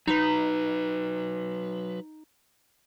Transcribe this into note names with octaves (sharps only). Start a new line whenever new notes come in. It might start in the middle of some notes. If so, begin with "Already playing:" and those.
F#3 D#4 B4